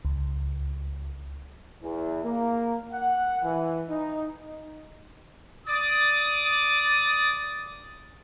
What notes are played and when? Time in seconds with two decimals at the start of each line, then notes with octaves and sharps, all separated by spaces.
0.05 C#2
1.82 E2
2.24 A#3
2.93 F#5
3.43 E3
3.90 D#4
5.67 D5 D#6